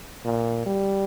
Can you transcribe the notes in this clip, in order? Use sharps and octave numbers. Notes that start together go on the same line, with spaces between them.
A#2
G3